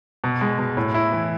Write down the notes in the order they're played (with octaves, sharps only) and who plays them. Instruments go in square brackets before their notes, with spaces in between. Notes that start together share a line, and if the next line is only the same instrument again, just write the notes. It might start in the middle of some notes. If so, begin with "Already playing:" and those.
[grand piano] B2
G#3
B2
A2
E4
E3